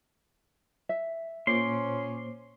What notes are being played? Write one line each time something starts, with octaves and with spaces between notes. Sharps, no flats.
E5
A#2 C#4 C5 C6 D6